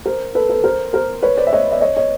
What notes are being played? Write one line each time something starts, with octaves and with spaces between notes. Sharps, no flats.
A#4 C5
A4 B4
A4 B4
A#4 C5
A#4 C5
B4 C#5
C5 D5
E5
C#5 D#5
D5 E5
C#5 D#5
C#5 D#5